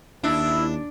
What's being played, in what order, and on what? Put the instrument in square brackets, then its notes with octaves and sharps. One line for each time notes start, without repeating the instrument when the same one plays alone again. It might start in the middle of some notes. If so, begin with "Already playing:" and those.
[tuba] D#2 [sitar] D4 [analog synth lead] E4 [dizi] E6